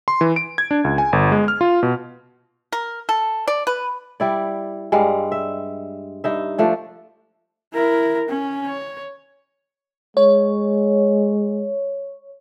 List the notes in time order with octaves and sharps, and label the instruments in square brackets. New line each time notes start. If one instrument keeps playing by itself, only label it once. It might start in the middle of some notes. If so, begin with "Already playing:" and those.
[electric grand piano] C6
E3
D7
G#6
D4
C#2
G#5
G1
G#3
F6
F4
B2
[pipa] A#4
A4
D5
B4
[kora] G3 E4 D5
G2 G3 G#3 F5
E5
G2 D#4 E5
F3 A3 D4
[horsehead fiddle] E4 A#4
C#4
C#5
[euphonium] G#3 [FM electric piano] C#5